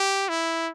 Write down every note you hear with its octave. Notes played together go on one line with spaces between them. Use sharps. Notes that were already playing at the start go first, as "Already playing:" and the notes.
Already playing: G4
E4